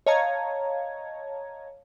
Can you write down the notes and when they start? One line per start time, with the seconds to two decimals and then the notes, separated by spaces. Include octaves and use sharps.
0.06 C#5 D#5 F5 A5 A#5 G#6